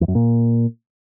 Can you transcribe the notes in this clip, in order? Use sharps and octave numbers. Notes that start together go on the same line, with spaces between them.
E2
F#2
A#2